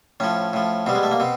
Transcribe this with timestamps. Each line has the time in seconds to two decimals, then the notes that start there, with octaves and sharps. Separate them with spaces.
0.20 A2 F3 C#4
0.53 A2 F3
0.86 B2 G3 C4
0.95 G#3
1.03 A3
1.11 A#3
1.20 B2 C4